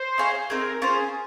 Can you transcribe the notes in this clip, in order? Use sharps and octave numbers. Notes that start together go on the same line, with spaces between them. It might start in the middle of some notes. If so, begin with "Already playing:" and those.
Already playing: C5
D#4 G#4 C#5 F5
C4 D#4 G#4 A#4
C#4 F4 G#4 C5